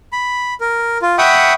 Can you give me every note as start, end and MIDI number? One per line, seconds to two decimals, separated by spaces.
0.12 0.54 83
0.61 0.98 70
1.02 1.16 65
1.18 1.53 76
1.18 1.53 78
1.18 1.53 79
1.18 1.53 83
1.18 1.53 85
1.18 1.53 87